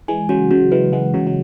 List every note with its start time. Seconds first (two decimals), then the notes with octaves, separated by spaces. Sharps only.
0.08 E3 G#3 G#5
0.29 C#3 F#3 F#4
0.51 C#3 F#3 F#4
0.72 E3 G#3 B4
0.92 E3 G#3 F#5
1.14 C#3 F#3 F#4
1.27 F#3